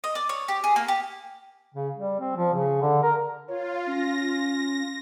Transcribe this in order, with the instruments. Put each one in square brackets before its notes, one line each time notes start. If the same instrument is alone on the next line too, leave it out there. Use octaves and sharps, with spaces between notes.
[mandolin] D#5
D5
C#5
G4
G#4
A#3
G4
[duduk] C#3
G3
C4
F3
C#3
D3
A#4
[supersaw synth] F4 [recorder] C#5
[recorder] C#4 [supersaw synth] A#6